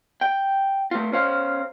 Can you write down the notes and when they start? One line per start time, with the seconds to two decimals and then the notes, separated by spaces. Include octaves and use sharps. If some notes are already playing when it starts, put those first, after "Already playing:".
0.21 G5
0.91 A3 F4
1.12 C#4 C5 F5